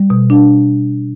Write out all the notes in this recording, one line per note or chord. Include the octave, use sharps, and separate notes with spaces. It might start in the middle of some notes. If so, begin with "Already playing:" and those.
Already playing: G3
B2
D4